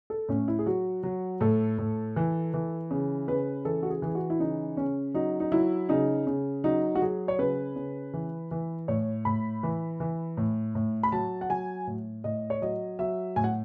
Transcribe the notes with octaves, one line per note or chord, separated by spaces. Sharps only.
A4
A2 C#4
E4
G#4
F#3 F#4
F#3
A2 A4
A2
E3
E3
C#3
C#3 B4
E3 A4
F#4
G#4
E3 G#4
F#4
E4
C#3 D#4
C#3 C#4
F#3 D#4
D#4
F#3 E4
C#3 D#4
C#3
F#3 D#4
F#4
F#3 G#4
C#5
C#3 B4
C#3
E3
E3
A2 C#5
A2 B5
E3
E3
A2
A2
B5
F#3 A5
F#5
F#3 G#5
A2
A2 D#5
C#5
F#3 D#5
F#3 E5
A2 G#5
F#5